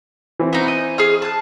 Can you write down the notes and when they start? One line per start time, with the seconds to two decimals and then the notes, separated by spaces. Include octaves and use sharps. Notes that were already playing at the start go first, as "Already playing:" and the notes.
0.40 E3 C4
0.53 B3 D#4
0.68 D#5
0.98 G#4 D#6 F6
1.22 A5 F#6